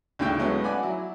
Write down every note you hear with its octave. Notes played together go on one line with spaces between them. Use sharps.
D2 A2 C#3 G5
F#3 G#3 A3 B3 C#4
F#4 D5 G#5 B5
F#3 E4